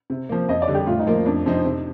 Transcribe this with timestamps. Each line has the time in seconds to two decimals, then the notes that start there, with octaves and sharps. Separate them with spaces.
0.10 C3
0.29 F3 A#3
0.49 F2 D#5
0.62 D5
0.68 D3 G3
0.75 G4
0.87 A2 F4
0.99 D#4
1.07 F3 A#3 F4 A#4
1.25 F2 D4
1.45 C3 F3 C4 D#4
1.65 C3